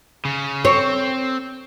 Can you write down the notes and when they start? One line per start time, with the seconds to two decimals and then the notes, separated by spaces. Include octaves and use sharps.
0.25 C#3
0.65 C4 C#5